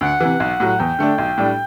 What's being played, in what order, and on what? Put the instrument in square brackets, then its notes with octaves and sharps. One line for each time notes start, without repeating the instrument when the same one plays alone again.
[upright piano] D2 [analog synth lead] F#5
[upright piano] C3 E3
B1
A2 F#3
[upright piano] E2 [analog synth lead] G5
[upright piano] D3 A3 D4
B1
A2 G3 D4